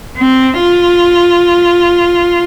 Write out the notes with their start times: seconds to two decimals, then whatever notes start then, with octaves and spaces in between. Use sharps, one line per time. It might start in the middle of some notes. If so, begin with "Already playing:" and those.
0.17 C4
0.62 F4